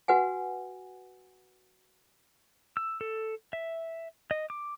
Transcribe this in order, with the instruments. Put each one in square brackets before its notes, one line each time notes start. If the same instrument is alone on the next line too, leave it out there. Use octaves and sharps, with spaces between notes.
[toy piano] F#4 B4 F#5 G#5
[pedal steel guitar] E6
A4
E5
D#5
D6